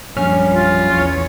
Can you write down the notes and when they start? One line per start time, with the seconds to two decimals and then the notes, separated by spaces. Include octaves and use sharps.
0.16 A#1 F#2 G3 C#4 F6
0.54 F4
0.92 E2 C#5